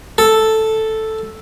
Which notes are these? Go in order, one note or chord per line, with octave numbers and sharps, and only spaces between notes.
A4